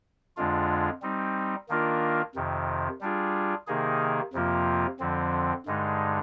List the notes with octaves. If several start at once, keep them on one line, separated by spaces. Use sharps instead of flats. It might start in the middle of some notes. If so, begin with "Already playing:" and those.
F2 D3 G#3 D4 F4
G3 C4 D#4
D#3 A#3 D4 F4 A#4
F2 C3 D#3
G3 D4 F4 G#4
C3 D#3 A#3 D#4 G#4
F2 C3 F3 A#3 F4
F2 D3 F3 C4
G2 D3 G#3 D#4